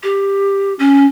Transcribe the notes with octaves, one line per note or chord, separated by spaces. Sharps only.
G4
C#4